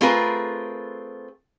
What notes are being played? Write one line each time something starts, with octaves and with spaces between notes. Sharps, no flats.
A3 C4 F4 G#4 A#4 B4